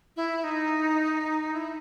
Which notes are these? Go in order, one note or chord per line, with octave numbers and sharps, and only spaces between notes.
E4
D#4
E4